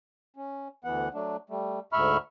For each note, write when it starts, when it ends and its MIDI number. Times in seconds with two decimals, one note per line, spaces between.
0.36 0.68 61
0.84 1.09 38
0.84 1.09 52
0.84 1.09 59
0.84 1.09 78
1.14 1.37 54
1.14 1.37 57
1.14 1.37 62
1.50 1.79 55
1.50 1.79 57
1.93 2.17 38
1.93 2.17 44
1.93 2.17 76
1.93 2.17 83
1.93 2.17 85
1.93 2.17 89